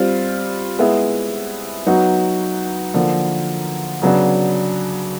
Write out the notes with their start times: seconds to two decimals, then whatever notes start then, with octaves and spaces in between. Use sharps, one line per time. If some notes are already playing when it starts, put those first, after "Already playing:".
Already playing: G3 C4 F4
0.79 G#3 B3 E4
1.86 F#3 B3 D#4 F#4
2.94 D3 F3 A#3
4.02 C#3 F#3 B3 D4